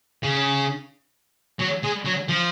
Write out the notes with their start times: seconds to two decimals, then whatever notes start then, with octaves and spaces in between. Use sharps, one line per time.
0.23 C#3
1.60 F#3
1.84 G#3
2.06 F#3
2.29 F3